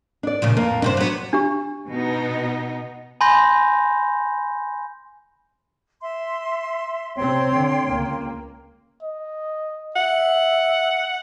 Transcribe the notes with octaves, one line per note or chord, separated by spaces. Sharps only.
D4 D5
A#2 C#3 F3
F2 A#3
G2 C3 D4 C5
F#3 B3
D4 G4 C#6
B2 B3 D#4
G#5 B5 C6 G6 A#6
E5 C6
C3 C4 C#5 G5 C6
D3
C#2 A#3
D#5
E5 F#5